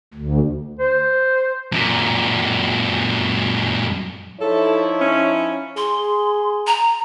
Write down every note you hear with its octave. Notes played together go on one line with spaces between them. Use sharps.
D2
C5
F#2 A#2
F3 D#4 E4 A4 C#5
C#4
G#4 C6
A#5